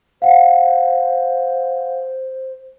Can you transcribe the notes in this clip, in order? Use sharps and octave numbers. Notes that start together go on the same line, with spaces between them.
C5 F5 F#5